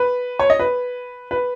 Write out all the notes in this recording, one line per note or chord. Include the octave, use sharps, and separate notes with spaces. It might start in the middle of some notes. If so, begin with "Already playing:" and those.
Already playing: B4
C#5
D#5
B4
B4